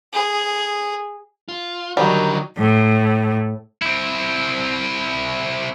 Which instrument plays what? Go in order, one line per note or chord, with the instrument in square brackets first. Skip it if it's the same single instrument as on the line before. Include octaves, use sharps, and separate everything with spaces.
[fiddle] G#4
[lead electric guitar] F4
[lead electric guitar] D3 A#4 [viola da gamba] D#3 F#3 [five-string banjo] G3
[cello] A2
[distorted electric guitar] C4 E4